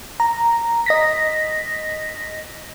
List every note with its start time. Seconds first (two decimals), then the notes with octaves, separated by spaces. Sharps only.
0.20 A#5
0.86 D#5 A#6 B6